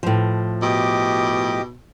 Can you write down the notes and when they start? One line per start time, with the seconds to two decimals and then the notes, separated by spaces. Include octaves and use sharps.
0.03 A2 F3
0.62 B2 G4 D#5 D6